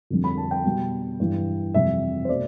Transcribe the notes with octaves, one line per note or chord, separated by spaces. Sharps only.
F2 D3 G3
B5
A5
G5
B2 G3
G2 E3 G3
F2 C3 E3 G3 E5
C5
B2 A3 D5